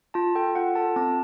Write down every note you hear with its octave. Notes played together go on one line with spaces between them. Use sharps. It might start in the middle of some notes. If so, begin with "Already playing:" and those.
F4 A5
A4 G5
F4 F#5
A4 A5
C4 A5